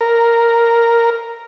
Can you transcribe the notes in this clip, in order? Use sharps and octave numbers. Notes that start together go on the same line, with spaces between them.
A#4